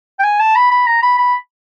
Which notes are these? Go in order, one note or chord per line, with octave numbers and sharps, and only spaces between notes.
G5
G#5
A5
B5
B5
A#5
B5
B5